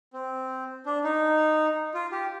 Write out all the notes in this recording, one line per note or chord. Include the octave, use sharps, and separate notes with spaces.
C4
D4
D#4
F4
G4